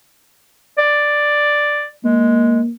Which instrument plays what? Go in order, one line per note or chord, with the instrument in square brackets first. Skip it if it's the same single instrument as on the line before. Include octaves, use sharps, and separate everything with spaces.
[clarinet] D5
[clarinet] G#3 [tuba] A#3